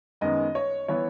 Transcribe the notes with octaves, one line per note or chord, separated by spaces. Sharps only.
F#2 D#3 G#3 B3 D#5
C#5
E3 B3 E4 C#5